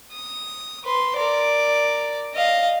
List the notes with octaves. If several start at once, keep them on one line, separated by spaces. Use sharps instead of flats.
D#6
B4 C6
A#4 D5
D#5 F5